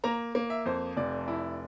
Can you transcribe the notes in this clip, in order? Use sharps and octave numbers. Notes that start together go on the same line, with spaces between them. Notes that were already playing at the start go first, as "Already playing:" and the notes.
A#3 A#5
A#3
E5
F2 C5
F1 D5
E4